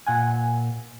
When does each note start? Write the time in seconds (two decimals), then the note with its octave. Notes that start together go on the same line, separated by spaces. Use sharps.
0.07 A#2 F#5 G#5